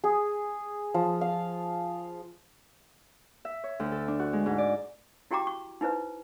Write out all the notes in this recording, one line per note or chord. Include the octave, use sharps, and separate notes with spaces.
G#4
F3
F5
E5
C#5
D2
A4
D4
F#4
G#3
G#2
D5
E4 F#4 G4 G5 A#5 D6
C#6
D#4 E4 B4 C5